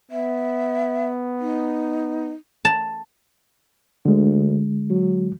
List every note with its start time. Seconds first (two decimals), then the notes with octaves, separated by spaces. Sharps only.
0.11 B3 E5
1.40 D#4
2.65 A5
4.05 D2 D3 G#3
4.90 F#3